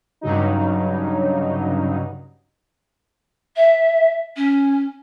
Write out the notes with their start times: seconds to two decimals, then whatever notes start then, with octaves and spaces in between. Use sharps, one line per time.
0.21 G2 C#3 F#3 D#4
3.56 E5
4.36 C#4